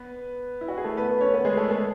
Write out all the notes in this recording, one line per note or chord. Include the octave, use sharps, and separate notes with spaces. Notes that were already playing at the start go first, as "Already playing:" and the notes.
Already playing: B3 B4
E4
F#4
G#4
A3 A4
B3 B4
B3 B4
C#4 C#5
B3 B4
G#3 G#4
A3 A4
A3 A4